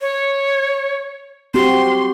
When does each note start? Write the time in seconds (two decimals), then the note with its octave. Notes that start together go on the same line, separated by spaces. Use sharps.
0.01 C#5
1.54 C4 F#4 G4 C6